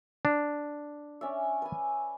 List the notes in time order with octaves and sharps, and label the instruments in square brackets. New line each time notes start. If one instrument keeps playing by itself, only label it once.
[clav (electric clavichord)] D4
[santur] C#4 D5 E5
B4 G#5